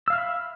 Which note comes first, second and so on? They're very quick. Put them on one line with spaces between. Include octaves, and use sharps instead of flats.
E6 F5 F6 E5 B5